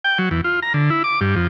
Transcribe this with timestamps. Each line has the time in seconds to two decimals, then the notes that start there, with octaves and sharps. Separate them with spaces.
0.04 G5
0.19 F#3
0.31 E2
0.44 F4
0.62 A#5
0.74 D3
0.90 E4
1.04 D6
1.21 G2
1.36 F2